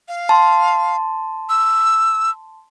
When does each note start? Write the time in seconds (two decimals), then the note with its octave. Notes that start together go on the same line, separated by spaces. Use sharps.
0.08 F5
0.29 A5 C6
1.49 E6